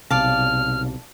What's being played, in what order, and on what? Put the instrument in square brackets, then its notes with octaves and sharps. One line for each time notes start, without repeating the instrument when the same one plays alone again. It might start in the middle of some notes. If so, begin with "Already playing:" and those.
[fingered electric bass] B1 C3 [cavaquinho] D5 F5 A5 [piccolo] F6